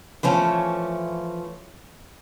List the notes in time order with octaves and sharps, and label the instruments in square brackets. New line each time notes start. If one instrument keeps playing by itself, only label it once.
[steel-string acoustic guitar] E3 F3 A3 C#4